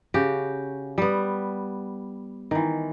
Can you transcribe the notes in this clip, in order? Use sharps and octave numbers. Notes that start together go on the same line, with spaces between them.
C#3 F#4 G4
G3 B3
D#3 E3